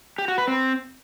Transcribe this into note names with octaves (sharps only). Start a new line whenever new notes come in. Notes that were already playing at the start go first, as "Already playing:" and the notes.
G4
F#4
B4
C4